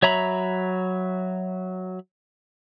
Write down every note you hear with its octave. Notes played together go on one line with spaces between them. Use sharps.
F#3 C#5 E5 A#5 B5